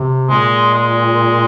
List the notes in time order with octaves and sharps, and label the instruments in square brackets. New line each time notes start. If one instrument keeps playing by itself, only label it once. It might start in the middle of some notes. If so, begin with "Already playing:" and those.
Already playing: [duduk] C3
[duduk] A#2 [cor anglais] G#3
[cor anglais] G#3